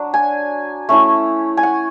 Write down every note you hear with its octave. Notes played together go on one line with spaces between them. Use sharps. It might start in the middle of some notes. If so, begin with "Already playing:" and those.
Already playing: F#3 D4
G#5
A3 C#4 E4
G#5
F#5